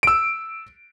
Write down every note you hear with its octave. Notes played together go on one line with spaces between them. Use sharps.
E6 D7